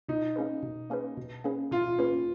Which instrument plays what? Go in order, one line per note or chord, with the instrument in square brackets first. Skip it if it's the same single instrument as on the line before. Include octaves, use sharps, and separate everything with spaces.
[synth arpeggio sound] B2 [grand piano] D#4
[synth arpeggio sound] A#3 C#4 G#4 B4
B2
A#3 C#4 G#4 B4
B2
A#3 C#4 G#4 B4
[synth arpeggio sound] B2 [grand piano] F4
[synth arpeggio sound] A#3 C#4 G#4 B4